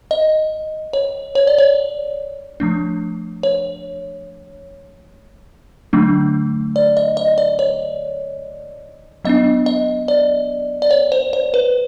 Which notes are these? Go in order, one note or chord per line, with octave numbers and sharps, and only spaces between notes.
D#5
C#5
C#5
D5
C#5
F3 A3 D4
C#5
D3 F#3 A3 D4
D5
D#5
D#5
D5
C#5
F#3 B3 D4 D#5
D#5
D5
D5
C#5
C5
C5
B4